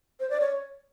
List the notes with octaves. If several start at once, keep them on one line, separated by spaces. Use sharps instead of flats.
C5
D5
C#5